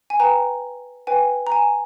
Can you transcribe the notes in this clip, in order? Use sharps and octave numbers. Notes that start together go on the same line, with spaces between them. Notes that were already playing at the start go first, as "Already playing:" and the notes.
G#5
B4 G5 A#5
B4 G5 G#5
A#5
G#5